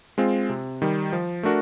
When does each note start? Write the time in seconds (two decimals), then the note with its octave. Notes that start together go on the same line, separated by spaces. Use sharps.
0.18 G#3 C4 F4
0.49 C3
0.82 D#3 G3
1.13 F3
1.43 A3 D4 F#4 A#4